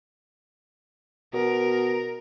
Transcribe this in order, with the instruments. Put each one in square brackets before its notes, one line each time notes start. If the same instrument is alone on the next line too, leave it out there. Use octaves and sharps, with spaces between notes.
[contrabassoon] B2 [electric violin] A#4